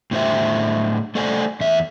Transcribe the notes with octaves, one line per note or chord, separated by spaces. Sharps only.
A2 D3 C5 E5
A3 A4 C5 D5 G#5
E2 E5